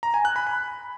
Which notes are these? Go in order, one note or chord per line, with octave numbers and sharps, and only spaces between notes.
A#5
G#5
F#6
B5
B5